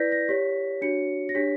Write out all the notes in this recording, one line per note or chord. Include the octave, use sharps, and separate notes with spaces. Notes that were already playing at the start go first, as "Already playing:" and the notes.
Already playing: E4 B4 D5 G6 A#6 B6
A#6
G4 C#5 B6
D4 F#4 C#5 C#7
A#6
D4 G4 C#5 B6